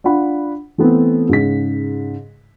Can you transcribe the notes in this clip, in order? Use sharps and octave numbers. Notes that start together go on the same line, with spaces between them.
D4 F4 F#5 B5
E3 A3 B3 C4
G#2 C#3 B6